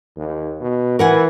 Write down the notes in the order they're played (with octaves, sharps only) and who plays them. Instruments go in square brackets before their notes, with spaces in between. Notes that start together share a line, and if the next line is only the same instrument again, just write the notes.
[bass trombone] D#2
B2
[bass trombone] E3 [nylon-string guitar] A#4 F#5 G#5